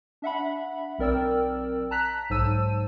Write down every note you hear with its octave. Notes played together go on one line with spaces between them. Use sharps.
D4 E5 F#5 B5
B1 C4 A#4 D5 G5 E6
A5 A#5 F#6 B6
B1 G#2 C5 A5 E6 D#7